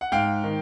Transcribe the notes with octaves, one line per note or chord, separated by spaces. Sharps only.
F#5
G#2 F5 G5
D#3